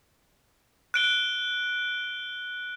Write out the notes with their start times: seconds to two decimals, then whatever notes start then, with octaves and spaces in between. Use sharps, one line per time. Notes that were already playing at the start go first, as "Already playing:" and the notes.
0.94 F#6 D7 G7